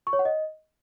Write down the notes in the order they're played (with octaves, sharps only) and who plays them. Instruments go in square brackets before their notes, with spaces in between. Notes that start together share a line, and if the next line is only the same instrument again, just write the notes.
[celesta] C#6
C#5
F#5
D#5